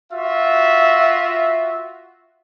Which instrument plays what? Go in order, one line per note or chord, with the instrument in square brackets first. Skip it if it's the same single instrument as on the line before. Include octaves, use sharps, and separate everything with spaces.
[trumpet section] F4 F#4 E5